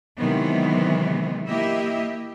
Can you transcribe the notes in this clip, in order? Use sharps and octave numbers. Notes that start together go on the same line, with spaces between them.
C3 D#3 E3 F#3 G#3 B3
A#3 E4 G4 D#5 E5